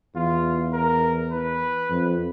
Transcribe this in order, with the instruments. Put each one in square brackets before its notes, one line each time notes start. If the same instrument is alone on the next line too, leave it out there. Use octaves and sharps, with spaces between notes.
[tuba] E2 [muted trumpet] F4
[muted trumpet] A#4
B4
[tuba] F2